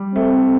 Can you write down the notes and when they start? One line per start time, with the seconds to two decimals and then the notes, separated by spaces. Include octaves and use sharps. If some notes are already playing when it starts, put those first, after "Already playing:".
Already playing: G3
0.15 A3 C4